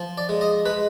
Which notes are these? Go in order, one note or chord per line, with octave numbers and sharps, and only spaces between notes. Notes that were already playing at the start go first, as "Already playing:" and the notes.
Already playing: F3
D5
G#3
D#5
G#3 B4